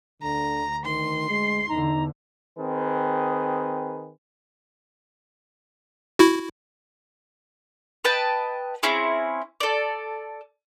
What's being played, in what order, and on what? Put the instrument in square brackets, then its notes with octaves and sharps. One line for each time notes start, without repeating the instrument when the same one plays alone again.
[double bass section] D2 [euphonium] D3 [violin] A#5
[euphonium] D#3 [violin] C6
[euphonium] G#3 [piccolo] C7
[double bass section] E2 D3 [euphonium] D#4 [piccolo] A#5
[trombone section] D#3 C4 G#4 B4
[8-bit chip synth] E4 F#4
[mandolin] B4 D#5 G5 A5
C4 C#4 E4 G#4
A4 D5